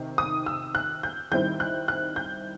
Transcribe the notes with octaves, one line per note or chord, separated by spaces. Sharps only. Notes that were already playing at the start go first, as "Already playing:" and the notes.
Already playing: C3 D#3
D#6
E6
F#6
G6
D#3 G3 C4 E4 G6
F#6
F#6
G6